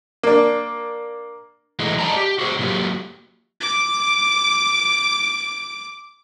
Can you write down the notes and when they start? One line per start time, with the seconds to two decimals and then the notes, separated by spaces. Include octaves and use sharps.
0.23 A#3 D4
1.79 E3 G#3 A3 D#4
1.99 D5 D#5 F5 G5 A5 A#5
2.16 G4
2.39 F#4 G#4 C5
2.59 A2 D3 F#3 A#3 F4 G4
3.61 D6 D7